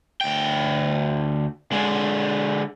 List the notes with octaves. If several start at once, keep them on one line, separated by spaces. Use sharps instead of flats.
D2 G5
D3 G#3